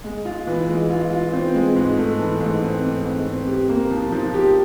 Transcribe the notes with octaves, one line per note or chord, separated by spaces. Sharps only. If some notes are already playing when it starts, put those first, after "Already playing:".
G#3
F4
E3
G#3
F4
F4
C4
G#3
G#2
A3
E3
G#2
C4
C4
G#2
C4
G4
A#3
F3
F3
G4